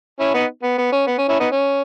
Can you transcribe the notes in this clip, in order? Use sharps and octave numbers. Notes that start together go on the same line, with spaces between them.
C#4 E4
B3 D#4
B3
B3
C#4
B3
C#4
C#4 E4
B3 D#4
C#4